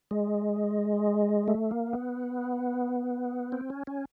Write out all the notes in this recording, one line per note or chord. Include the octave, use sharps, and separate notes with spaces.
G#3
A3
A#3
B3
C4
C#4
C#4